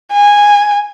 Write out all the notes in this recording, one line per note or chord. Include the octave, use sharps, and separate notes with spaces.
G#5